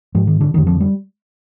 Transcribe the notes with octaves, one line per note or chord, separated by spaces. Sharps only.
G#2 F3
D#3
D3
F2 D3 D#3
F3
G3